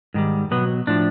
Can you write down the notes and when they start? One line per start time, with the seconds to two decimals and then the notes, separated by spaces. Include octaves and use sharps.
0.14 G#2 D#3 G3
0.51 B2 F#3 B3
0.87 A2 F3 D4